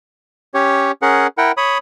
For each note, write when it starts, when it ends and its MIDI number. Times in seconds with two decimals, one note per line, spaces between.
0.54 0.92 61
0.54 0.92 67
0.54 0.92 73
1.02 1.27 61
1.02 1.27 68
1.02 1.27 70
1.02 1.27 78
1.38 1.52 64
1.38 1.52 70
1.38 1.52 78
1.38 1.52 79
1.57 1.78 73
1.57 1.78 83
1.57 1.78 87